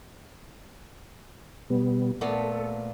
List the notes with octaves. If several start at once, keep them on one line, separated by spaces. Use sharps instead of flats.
B2 G3 B3
A#2 A3 B3 A4